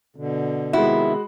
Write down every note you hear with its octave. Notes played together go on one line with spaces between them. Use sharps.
B2 D3
C3 D#3 G#3 B3 E4 F#4